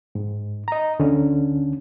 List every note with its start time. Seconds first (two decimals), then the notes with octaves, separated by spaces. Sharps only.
0.15 G#2
0.68 D#5 A#5
0.99 D2 D3 C#4